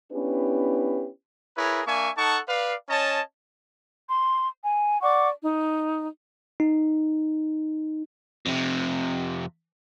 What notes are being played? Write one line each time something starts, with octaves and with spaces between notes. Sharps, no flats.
B3 C#4 D4 E4 G4 B4
E4 G#4 A#4 B4 C#5
A#3 D4 E5 G#5 C#6
D#4 A4 F#5 A5 C#6
B4 D5 F5
C#4 C#5 D#5 A5
C6
G#5
D5 F#5 C#6 D6
D#4
D#4
F2 C3